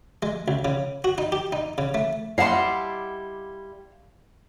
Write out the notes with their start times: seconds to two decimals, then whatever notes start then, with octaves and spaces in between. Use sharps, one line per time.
0.23 G#3
0.48 C#2
0.65 C#3
1.04 F#4
1.18 D#4
1.32 G4
1.52 D#4
1.78 C#3
1.94 A3
2.38 G3 E4 D#5 F5 F#5 A5 C6